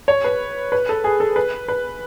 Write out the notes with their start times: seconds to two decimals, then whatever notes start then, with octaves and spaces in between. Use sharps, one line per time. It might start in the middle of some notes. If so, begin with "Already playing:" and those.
0.08 C#5
0.24 B4
0.72 B4
0.89 A4
1.04 G#4
1.20 A4
1.36 B4
1.68 B4